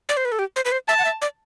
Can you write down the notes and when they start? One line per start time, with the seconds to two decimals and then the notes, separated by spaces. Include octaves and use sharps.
0.09 D5
0.17 C5
0.25 B4
0.32 A4
0.39 G4
0.56 C5
0.65 B4
0.72 C5
0.88 E5 A5
0.99 F#5
1.05 E5
1.22 D5